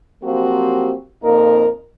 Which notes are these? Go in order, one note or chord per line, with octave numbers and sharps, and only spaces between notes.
F3 F#3 A#3 C4 F#4 G4
F2 A#2 A#3 D#4 A#4